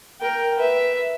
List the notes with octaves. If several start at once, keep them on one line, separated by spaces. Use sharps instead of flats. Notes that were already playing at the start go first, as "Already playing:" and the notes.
A#4 G5
B4 E5